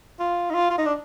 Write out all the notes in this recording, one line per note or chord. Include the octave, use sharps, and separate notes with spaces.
F4
D#4
F4
F4
D#4
D4